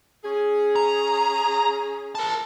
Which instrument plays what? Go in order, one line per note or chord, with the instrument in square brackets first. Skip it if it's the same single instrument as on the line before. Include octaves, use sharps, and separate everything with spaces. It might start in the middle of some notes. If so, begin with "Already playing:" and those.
[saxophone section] C#4 G#4
[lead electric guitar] A#5
A#4 A5